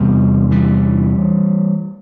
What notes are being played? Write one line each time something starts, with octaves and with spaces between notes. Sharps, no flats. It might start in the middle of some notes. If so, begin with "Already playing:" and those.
Already playing: E2 C3 G3 B3
E3 G3